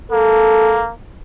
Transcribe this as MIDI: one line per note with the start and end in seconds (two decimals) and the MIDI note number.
0.11 0.91 58
0.11 0.82 69